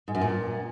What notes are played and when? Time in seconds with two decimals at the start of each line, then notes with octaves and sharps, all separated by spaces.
0.08 G#2
0.15 F#2
0.21 A#2